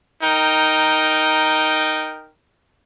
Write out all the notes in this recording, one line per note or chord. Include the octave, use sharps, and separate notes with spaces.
D#4 A#4 G5